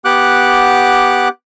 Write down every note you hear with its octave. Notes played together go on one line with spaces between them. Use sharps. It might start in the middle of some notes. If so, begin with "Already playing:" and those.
B3 G4 F#5 D6 F#6